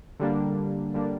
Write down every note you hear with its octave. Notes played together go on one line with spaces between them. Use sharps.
D3 G3 A#3 D4
D3 G3 A#3 D4